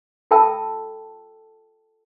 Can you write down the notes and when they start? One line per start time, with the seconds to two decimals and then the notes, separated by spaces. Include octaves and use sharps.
0.31 F4 A4 E5 G5 A5 E6